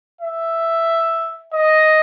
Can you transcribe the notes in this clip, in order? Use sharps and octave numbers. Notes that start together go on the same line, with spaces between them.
E5
D#5